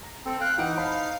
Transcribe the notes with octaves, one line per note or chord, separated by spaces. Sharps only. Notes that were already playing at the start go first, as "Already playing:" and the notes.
A#5
C4 A4
F5 G5 F#6
E3 D#4 F#5 D7
C5 F5 A5 B5